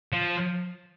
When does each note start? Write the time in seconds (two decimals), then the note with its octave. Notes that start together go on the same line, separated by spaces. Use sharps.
0.12 F3